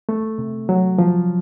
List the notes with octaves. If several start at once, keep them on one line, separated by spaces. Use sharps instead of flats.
A3
C3
F#3
F3